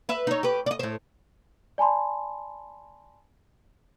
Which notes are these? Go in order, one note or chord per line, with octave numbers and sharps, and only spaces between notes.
B4 E5
D#4 C#5
G4 B4
D5 D#5
A2 C5
D5 G#5 A5 B5 C6